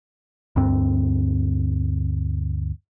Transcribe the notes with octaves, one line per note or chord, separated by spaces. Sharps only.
D2 G2 C4